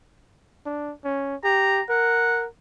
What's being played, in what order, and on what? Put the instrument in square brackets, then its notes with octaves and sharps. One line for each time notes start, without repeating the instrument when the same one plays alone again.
[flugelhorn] D4
C#4
[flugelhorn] G4 [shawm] A#5
[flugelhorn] A#4 [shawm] F#5